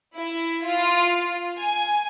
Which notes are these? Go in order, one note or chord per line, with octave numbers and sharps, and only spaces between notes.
E4
F4
G#5